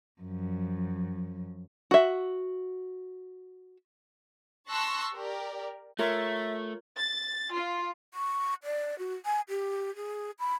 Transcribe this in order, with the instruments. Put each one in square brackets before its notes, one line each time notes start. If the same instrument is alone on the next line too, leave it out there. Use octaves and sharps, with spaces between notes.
[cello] F#2 F3
[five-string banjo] F#4 E5
[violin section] A5 C6 C#6 E6 F#6 A#6
G4 A#4 D5
[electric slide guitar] A3 [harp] F4 A#4 C#5 [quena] E5
[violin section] A6
F4
[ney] C#6
D5
F#4
G#5
G4
G#4
B5